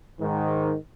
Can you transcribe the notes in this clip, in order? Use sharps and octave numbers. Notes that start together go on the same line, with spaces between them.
G#2 D#3